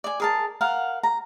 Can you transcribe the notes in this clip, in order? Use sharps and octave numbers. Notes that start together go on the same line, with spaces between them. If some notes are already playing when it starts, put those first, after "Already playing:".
D5 G#5
G#4 A#4 A5
A#4 F5 F#5
A#5